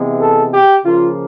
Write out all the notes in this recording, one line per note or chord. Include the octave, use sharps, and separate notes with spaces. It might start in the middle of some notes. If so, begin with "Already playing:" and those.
Already playing: C3 E3 G#3 B3
A4
G4
C#3 F3 A#3 F4